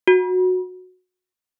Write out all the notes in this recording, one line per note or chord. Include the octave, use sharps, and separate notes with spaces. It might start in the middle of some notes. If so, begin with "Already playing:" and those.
F#4